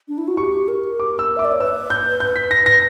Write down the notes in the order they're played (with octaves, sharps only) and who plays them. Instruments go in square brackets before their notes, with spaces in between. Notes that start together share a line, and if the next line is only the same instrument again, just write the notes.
[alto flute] D4
E4
F#4
[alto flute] G4 [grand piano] C#6
[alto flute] A#4
[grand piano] D6
E6
[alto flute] E5 [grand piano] D6
[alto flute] D5
C#5
[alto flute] B4 [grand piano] E6
[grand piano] G6
G6
B6
A#6
A#6